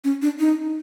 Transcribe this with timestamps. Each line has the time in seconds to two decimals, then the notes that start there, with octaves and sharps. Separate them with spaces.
0.04 C#4
0.22 D4
0.39 D#4